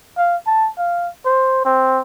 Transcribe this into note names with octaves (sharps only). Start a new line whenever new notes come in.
F5
A5
F5
C5
C4